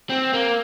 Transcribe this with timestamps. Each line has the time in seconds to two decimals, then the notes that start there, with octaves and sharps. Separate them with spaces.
0.10 C4
0.33 A#3